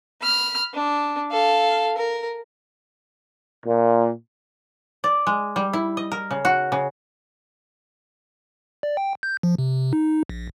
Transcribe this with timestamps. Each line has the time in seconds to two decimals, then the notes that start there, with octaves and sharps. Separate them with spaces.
0.22 B5 F6
0.74 D4
1.31 A4 F5
1.97 A#4
3.66 A#2
5.04 D5
5.27 G#3
5.56 G3
5.73 E4
5.97 D#5
6.12 A#4
6.31 C#3
6.45 F#4
6.72 C#3
8.83 D5
8.97 G5
9.23 G6
9.43 F3
9.58 C3
9.93 D#4
10.29 A#1